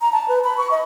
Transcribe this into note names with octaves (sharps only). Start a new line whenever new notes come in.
A#5
A5
B4
B5
C#6
D#5